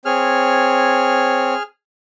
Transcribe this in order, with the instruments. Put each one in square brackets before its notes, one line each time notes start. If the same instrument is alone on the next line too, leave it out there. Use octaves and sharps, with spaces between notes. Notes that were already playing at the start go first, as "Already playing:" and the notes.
[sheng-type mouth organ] C4 C#5 [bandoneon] G#4 F6